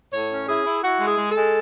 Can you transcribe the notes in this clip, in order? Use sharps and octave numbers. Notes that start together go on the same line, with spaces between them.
A2 C#5
C#4
E4 G#4
E4
E4 F#4
G#3
G#4
G#3
A4
G#3